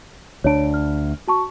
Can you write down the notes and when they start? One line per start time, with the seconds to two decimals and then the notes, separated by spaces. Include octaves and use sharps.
0.44 D2 D4 C#5 D7
0.74 F6
1.28 F#4 A5 C#6